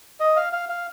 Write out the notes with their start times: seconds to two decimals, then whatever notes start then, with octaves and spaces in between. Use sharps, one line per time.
0.20 D#5
0.36 F5
0.53 F5
0.69 F5